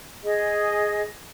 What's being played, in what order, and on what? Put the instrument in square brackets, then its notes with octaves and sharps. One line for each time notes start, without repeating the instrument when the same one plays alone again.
[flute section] G#4 D#5